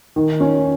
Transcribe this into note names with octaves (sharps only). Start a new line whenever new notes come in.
D#3
C#4